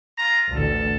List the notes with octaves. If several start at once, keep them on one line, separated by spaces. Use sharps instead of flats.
F4 A#5
A1 D2 A4 A5